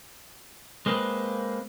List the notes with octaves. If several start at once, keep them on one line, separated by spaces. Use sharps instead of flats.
G#3 A#3 C4 B4